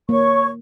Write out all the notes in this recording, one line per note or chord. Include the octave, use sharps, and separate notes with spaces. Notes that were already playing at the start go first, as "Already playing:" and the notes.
A#3 C#5 C#6